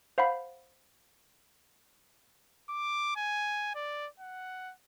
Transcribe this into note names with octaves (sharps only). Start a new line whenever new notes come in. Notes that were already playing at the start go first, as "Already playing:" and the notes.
C5 F5 F#5 B5
D6
G#5
D5
F#5